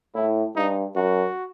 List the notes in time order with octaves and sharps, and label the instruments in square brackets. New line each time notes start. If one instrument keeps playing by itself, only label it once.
[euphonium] A2 [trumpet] E4
[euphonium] G2 [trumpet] D#4
[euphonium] F#2 [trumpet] F#4